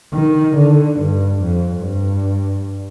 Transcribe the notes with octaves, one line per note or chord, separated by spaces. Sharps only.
D#3
D3
G2
F2
G2